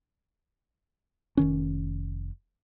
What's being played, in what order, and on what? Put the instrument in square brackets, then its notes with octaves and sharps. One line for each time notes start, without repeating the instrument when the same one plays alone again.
[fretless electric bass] F1 D#3 C#4